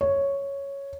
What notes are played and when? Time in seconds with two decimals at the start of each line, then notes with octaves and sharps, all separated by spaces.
0.01 C#5